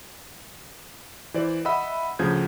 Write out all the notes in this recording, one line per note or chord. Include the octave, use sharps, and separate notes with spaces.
E3 C5 D5
D#5 E5 F#5 B5 E6
D2 C#3 F3 G#4 G6 G#6